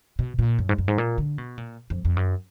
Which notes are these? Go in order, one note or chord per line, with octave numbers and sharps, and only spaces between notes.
B2
A#2
F#2
G#2
F#2
G#2
A#2
D3
B2
A#2
F2
F2
F#2